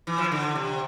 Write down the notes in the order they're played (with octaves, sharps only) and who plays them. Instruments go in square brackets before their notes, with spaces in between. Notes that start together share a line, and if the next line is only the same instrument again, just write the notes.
[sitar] E3
F3
E3
D3
C3